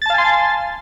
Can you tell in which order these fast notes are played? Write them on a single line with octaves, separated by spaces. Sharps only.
A6 A5 F5 G#5 C6